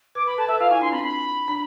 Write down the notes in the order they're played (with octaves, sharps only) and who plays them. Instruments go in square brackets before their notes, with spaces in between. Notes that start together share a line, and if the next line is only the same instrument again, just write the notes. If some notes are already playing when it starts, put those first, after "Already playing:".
[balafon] B4 [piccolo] D6
[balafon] B4 [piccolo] B5
[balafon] A4 [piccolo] A5
[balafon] B4 [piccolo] E5
[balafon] F4 [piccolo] F5
[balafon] E4 [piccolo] G#5
[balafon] D4 [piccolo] C6
[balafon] C4 [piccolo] B5
[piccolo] B5
[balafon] D4